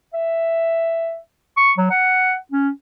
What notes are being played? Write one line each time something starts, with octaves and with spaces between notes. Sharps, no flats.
E5
C#6
F#3
F#5
C#4